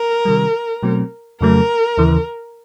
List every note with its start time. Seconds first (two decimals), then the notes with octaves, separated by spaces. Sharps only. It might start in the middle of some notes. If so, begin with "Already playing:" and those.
Already playing: A#4
0.25 C3 D#3 G3
0.83 B2 F#3 A3 C4
1.40 F2 C#3 F#3 A3 A#4
1.98 D#2 C#3 E3